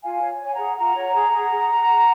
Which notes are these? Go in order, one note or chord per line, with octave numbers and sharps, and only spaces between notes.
F4 F5 G#5
C#5
C#5 G#5
F#5 A#5
G#4
F4 F#5 A#5
C#5
G#4
G#4
G#4